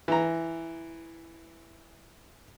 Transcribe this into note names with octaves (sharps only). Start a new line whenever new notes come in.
E3 A#5